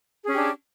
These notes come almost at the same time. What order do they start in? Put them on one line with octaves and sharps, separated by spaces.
G#4 C#4 G4 D4